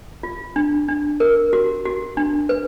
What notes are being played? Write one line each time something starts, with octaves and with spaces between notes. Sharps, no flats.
F4
D4
D4
A#4
F#4
F#4
D4
B4